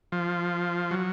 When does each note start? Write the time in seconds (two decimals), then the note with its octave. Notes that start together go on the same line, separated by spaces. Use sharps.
0.12 F3
0.91 F#3